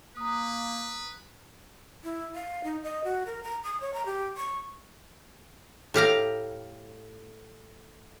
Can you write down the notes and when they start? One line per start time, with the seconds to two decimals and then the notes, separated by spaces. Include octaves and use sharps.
0.17 A#3 B4 A#5 D#6
2.04 E4
2.35 F5
2.64 D#4
2.83 D#5
3.04 F#4
3.26 A#4
3.43 A#5
3.64 D#6
3.81 C#5
3.94 A#5
4.05 G4
4.37 C#6
5.94 A2 G4 F5 A#5